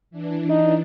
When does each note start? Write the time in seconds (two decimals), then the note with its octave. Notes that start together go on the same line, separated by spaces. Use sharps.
0.11 E3 D4
0.49 D#4